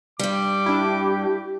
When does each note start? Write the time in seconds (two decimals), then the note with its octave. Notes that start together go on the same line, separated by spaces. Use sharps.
0.19 G2 G3 D6
0.66 D4 E4 G4